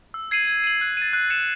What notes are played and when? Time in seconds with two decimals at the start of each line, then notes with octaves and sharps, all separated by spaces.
0.14 E6
0.31 G#6 C7 D#7 F#7
0.47 G#6
0.64 D#7 F#7
0.81 F#6
0.97 A6 D#7
1.13 F#6
1.30 A6 C#7 E7